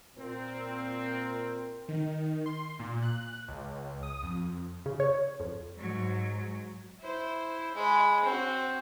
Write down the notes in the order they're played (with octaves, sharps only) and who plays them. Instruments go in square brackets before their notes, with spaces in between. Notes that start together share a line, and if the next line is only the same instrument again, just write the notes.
[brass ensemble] A#2 C4 A#4
[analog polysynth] D#3
C6
A#2
F#6
C#2
D#6
F2
[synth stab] C#3
C#5
F2
[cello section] G#2 F#3
[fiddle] E4 C5
G#3 B5
C4 F#4